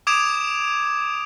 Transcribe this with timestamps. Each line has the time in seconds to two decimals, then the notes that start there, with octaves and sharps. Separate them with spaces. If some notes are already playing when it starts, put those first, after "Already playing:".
0.07 D6 D#6 G#6 D7 E7 F7